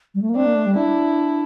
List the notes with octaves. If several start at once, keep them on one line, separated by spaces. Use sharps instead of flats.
G3
A3
A#3
C4 D4
A#3
A3
G3
D4 E4